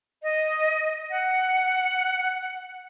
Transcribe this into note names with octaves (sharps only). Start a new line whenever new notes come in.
D#5
F#5